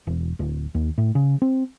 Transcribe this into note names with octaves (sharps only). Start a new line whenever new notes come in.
E1
D1
D#2
A2
C#3
C4